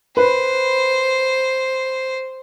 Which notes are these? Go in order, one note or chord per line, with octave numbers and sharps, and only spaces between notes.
B4 C5